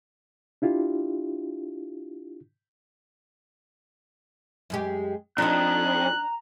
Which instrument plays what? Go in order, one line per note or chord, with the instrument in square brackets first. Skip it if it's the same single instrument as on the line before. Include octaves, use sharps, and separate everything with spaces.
[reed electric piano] D4 E4 F4 G4
[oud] F#2 G#3 G4
[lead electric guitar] F2 [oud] D4 D#4 [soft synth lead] A#5 [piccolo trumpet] F#6